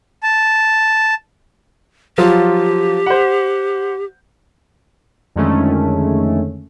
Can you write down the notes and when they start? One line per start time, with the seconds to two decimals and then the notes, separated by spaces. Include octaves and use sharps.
0.23 A5
2.18 F3 F#3 F4 G4
3.06 C5 F#5
5.35 F2 D3 D#3 G#3 A3 C#4